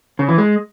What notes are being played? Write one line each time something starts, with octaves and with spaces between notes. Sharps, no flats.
C#3
E3
G#3